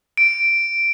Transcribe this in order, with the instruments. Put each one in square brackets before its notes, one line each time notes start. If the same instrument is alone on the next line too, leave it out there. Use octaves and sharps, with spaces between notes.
[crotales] D7